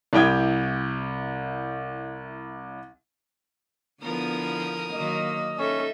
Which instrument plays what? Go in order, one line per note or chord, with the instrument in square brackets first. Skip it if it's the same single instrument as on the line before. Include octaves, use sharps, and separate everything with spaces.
[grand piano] C2 E4 G4 G5 D#6 G#6
[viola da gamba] D3 F3 E4 [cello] B3 [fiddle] A#4 D#6
[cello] D#3 F#3 [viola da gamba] A#3 [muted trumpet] D#5
[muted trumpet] C#4 [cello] D#4 A4 [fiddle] E5